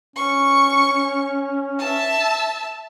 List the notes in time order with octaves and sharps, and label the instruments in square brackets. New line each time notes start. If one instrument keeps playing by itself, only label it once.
[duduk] C#4 [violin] C#6
[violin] E5 A5